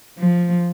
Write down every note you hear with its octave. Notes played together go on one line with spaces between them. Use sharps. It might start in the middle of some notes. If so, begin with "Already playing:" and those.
F3